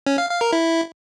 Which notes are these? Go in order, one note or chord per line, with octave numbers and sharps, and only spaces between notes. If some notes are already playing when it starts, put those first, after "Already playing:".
C#4
F5
F5
A#4
E4